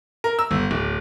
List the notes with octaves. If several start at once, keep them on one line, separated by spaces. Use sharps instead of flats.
A#4
E6
G1
D1